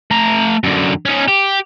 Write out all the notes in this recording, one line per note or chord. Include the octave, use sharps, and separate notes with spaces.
A3 A#5
F#2 D3
C#4 D#4
G4